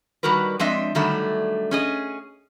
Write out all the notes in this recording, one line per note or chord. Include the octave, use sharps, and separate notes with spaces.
D#3 G3 F#4 A#4 B4
F3 G#3 C4 D4 D#5 E5
D3 D#3 F#3 G3 A3 E5
C#4 G#4 D#5